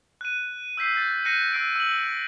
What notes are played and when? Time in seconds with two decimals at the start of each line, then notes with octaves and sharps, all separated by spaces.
0.21 F#6 D#7
0.77 E6 G6 B6 C7
0.95 G6 A6
1.25 F#6 A#6 C7 C#7 D#7
1.53 E6 F#6 C7 D7
1.76 E6 F#7